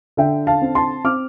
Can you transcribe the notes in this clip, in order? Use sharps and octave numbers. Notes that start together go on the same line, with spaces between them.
D3 E5 G5
F5 A5
C4
A5 C6
C4 D6 F6